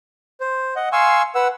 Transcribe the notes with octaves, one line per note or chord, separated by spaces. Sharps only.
C5
D#5 F#5
F5 G#5 C6 C#6 E6
B4 F#5 E6